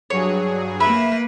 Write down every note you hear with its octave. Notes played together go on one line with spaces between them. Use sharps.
G2 F#3 G#4 C#5
A#3 B4 E5 B5